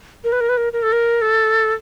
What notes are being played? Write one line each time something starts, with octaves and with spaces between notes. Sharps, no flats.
A#4
B4
A#4
B4
A#4
A#4
A4
A#4
A4